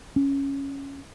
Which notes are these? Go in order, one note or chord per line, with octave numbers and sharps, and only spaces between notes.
C#4